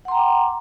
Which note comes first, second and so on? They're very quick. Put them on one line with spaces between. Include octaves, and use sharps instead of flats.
F#5 C6 A#5 G5 D6